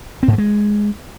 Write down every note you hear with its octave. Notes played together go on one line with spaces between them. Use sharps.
C4
G#2
A3
G#3